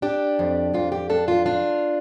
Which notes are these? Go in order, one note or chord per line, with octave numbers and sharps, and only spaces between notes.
D4 G4
F2
F2 F4
G4
D4 A4
F4
D4 F4